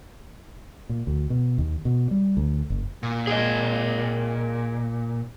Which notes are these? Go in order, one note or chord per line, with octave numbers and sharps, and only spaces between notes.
A#2
D2
B2
D#2
B2
G3
D2
F#1
A#2
G#4 A#4 D#5